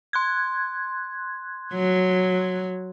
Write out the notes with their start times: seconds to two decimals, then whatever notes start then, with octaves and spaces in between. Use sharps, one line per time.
0.13 C6 F#6 G#6
1.73 F#3